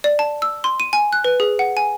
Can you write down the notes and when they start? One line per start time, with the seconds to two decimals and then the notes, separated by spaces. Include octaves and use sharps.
0.04 D5
0.19 A5
0.42 E6
0.64 C6
0.80 D#7
0.93 G#5
1.13 F#6
1.24 B4
1.40 G#4
1.59 F#5
1.77 G#5